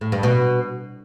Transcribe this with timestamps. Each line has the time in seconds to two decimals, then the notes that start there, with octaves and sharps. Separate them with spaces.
0.01 A2
0.12 G2
0.23 B2